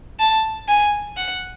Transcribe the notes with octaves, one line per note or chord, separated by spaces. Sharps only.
A5
G#5
F#5